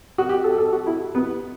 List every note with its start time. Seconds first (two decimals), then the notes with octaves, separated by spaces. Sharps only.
0.18 F#4
0.29 G4
0.44 A4
0.58 A4
0.73 F#4
0.86 E4
1.15 B3